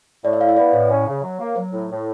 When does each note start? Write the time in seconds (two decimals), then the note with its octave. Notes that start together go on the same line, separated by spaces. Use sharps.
0.24 A2 D5
0.33 E5
0.41 E4 F5
0.49 E5
0.57 B3 D5
0.73 A2 C#5
0.90 C#4
1.07 C#3
1.23 F#3
1.39 A#3
1.56 F#3 C5
1.73 A2
1.90 A2